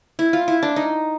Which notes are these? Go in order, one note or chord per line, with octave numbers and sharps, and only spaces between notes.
E4
F4
E4
D4
D#4